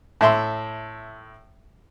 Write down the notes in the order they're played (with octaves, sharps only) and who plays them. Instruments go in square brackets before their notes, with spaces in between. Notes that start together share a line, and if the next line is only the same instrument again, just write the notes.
[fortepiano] A2 E5 C6